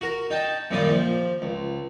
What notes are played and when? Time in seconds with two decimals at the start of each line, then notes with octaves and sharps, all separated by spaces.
0.01 F#4 A#4 A#5
0.30 D#4 G5 A5
0.71 F#2 A#2 D#3 G3 D#4 F4
0.90 F3
1.42 C#2